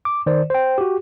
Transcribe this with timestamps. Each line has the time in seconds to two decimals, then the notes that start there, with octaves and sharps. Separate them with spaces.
0.05 D6
0.26 D#3 C5 D5
0.50 C5 G5
0.78 F#4 G4